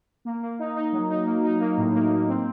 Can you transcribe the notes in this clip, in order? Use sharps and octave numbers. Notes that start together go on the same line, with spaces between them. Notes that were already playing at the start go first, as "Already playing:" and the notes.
A#3
A#3
D#4
D#4
F#3
D#4
A#3
D#4
A#3
A2
A#3
A#3
C4